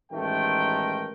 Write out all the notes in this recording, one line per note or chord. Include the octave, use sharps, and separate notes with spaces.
A1 D#3 G#3 A3 A#4 G5